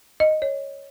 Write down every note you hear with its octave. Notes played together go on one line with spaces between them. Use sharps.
D#5
D#5
C#5